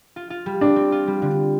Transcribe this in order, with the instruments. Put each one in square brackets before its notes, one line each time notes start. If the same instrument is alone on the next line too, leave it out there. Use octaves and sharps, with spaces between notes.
[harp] F4
F4
G3
[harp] C4 [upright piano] D4
[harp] C4
F4
G3
D3